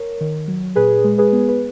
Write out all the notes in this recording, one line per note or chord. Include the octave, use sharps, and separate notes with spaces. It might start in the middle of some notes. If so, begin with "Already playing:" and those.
Already playing: A#4 C#5
D#3
F#3
A#2 G#4 B4
G#3
G#4 B4
B3
B4